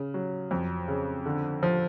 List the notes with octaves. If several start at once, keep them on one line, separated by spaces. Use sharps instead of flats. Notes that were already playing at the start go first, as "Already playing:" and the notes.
Already playing: C#3
F#3
F2
C#3
D3
F3